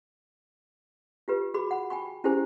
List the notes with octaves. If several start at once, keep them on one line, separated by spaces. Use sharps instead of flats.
F4 G4 B4
F#4 G#4 B5 D6
F#5 B5
G5 G#5 B5 C#6
C#4 E4 G4 G#4 C5 G#5